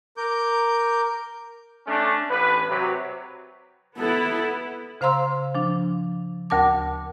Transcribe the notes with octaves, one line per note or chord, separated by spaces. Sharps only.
A#4 D6 G6
A3 C#4 D4
A1 B4
C3 F#3
B3 E4 A4
C#3 C5 F5 A#5 C6 E6
F3 D4
D2 A#4 A5 D6